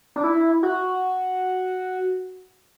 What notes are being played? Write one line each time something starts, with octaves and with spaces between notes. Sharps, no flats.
D4
E4
F#4